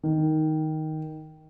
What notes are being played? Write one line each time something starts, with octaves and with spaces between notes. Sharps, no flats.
D#3